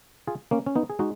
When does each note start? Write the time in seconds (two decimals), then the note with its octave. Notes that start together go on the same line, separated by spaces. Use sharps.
0.27 F4 G#4
0.51 A#3 C#4
0.66 C#4
0.75 B3 D#4
0.90 G#4
0.99 G#3 D#4 F#4